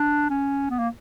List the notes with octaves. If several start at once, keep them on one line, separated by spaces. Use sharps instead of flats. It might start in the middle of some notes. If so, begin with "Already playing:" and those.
Already playing: D4
C#4
B3
A#3